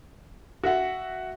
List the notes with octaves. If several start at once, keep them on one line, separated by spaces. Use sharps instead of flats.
F#4 E5 F#5